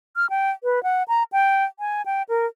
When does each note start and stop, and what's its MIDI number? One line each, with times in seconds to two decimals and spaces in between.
0.16 0.29 89
0.30 0.51 79
0.64 0.82 71
0.83 1.03 78
1.08 1.23 82
1.32 1.64 79
1.79 2.02 80
2.06 2.23 79
2.29 2.46 70